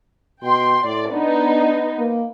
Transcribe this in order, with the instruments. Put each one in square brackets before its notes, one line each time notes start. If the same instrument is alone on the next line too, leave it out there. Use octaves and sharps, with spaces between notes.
[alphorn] B2 [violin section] G5 C6
[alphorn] A2 [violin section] D5
[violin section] B3 D#4 [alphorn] D4
[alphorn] A#3